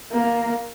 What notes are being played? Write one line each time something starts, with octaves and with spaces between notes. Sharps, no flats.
A#3